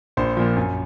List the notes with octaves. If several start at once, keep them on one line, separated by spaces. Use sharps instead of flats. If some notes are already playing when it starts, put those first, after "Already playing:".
A#1 C5
A#2 F3
F#2